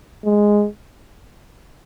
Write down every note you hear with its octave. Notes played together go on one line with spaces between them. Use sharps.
G#3